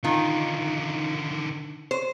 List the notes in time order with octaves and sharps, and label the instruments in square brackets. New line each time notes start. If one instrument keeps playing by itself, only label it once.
[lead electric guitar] D3 D#4 [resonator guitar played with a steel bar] D#3 F4
[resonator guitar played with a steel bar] C5